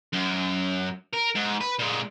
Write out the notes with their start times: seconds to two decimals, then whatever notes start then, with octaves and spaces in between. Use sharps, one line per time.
0.13 F#2
1.14 A#4
1.35 G#2
1.61 B4
1.79 A#2 G#3